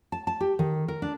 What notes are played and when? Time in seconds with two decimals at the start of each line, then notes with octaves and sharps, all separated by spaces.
0.12 A5
0.27 A5
0.40 G4
0.59 D#3
0.88 A#4
1.02 D4